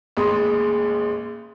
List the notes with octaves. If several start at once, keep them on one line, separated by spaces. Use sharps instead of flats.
A1 D#2 G#3 B5 C6 D#6